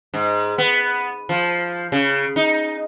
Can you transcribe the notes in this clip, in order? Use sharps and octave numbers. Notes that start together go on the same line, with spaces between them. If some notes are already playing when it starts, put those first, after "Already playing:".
G#2
B3
F3
C#3
D#4